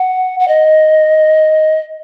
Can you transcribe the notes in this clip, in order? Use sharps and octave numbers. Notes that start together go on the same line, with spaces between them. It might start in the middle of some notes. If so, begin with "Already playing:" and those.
Already playing: F#5
F#5
D#5